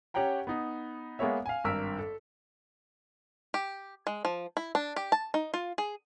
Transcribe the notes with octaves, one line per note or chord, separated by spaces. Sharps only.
C#4 G4 C#5 F#5 G5 A#5
B3 D#4
G#3 A#3 B3 G#4 C#5 E5
F5 G#5
G#1 G2 A#4 E6 B6
A4
G4
G#3
F3
E4
D4
G4
A5
D#4
F4
G#4